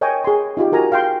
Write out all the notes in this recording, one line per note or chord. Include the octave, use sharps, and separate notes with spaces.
A#4 C#5 D#5 G5 G#5
G#4 C6
D#4 F4 G4
F#4 A#4 G#5 A#5
F5 G5 C6